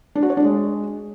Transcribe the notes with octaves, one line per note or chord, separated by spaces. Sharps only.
D4
F#4
C#5
D4
G#3